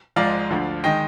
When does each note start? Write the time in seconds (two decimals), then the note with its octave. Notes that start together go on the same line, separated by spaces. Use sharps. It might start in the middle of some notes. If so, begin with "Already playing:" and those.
0.16 G#1 G#2 F3 G#3 D5 F5
0.51 D2 D3 F3
0.84 D#3 G#3 D#5 G5